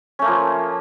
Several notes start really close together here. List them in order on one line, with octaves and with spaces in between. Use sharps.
C#4 A3 A#3 F3